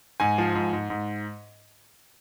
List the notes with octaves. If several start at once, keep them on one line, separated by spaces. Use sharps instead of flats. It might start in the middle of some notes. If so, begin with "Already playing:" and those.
G#2 G#5
F3
G#2
G#2
G#2